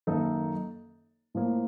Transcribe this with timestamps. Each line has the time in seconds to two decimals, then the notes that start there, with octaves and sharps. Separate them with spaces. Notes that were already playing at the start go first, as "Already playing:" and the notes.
0.07 F#2 D#3 A#3 D#4 A4
1.34 A2 F3 A#3